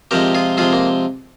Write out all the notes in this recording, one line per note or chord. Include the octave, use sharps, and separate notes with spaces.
C3 F3 G#3 G4 A#4
F4 G#4
C3 F3 G#3 F4 G#4
A#3